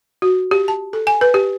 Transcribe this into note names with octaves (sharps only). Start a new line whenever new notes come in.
F#4
G4
A5
A4
G#5
B4
G4